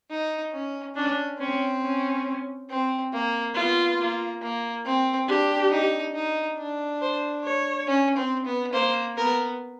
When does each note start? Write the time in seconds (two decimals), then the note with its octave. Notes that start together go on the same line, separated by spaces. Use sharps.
0.10 D#4
0.53 C#4
0.96 C#4 D4
1.39 C4 C#4
1.82 C#4
2.70 C4
3.13 A#3
3.55 B3 F4
3.99 A#3
4.42 A#3
4.85 C4
5.28 D4 G4
5.71 D#4
6.15 D#4
6.57 D4
7.02 C5
7.44 C#5
7.88 C#4
8.17 C4
8.45 B3
8.73 A#3 C5
9.17 B3 A#4